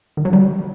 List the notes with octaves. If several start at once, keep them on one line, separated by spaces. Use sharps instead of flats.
D#3
F#3
G3